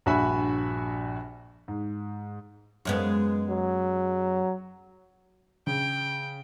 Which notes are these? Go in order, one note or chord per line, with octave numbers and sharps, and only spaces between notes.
A#1 G2 F#4 E5 G#5 B5
G#2
F#2 G#3 B3
F#3
C#3 G5